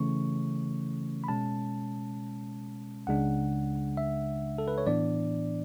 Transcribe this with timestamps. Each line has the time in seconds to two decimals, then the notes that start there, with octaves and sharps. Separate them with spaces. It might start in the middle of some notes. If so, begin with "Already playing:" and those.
Already playing: C#3 E3 A3 C#4 C#6
1.24 B5
1.28 B2 G#3 C#4 A5
3.07 C#2 C#3 G#3 D4 F#5
3.97 E5
4.58 A4
4.68 B4
4.78 C#5
4.87 A2 E3 B3 D4 D5